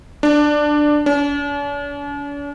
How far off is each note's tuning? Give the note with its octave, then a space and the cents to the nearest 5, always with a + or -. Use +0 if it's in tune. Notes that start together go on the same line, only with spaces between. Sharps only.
D4 +10
D4 -45